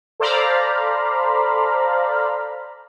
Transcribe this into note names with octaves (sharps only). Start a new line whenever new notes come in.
A4 C5 D5 F5 A#5 B5